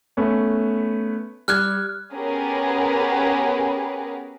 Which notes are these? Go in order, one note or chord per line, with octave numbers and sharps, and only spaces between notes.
A3 B3 C#4
G3 F6 F#6 G#6
B3 C#4 G4 G#4 A#4 B4